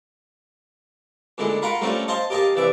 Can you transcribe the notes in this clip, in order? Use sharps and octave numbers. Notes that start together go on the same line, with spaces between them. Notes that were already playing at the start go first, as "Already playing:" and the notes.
A#2 D3 G#3 E4
F4 A#4 F5 F#5 A#5 B5
G3 A3 A#3 C4 C#4 F4
C5 D#5 F5 G#5 A5 C6
G4 A#4 D#5 F5 G#5 A5
C2 E3 D5 E5 D6